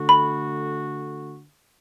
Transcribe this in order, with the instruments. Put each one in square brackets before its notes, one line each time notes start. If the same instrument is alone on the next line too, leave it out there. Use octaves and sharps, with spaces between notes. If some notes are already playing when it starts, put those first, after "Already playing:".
Already playing: [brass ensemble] D3 A3 F#4
[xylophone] B5